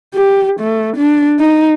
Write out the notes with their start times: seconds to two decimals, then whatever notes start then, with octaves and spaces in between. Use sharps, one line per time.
0.15 G4
0.60 A3
0.97 D4
1.40 D#4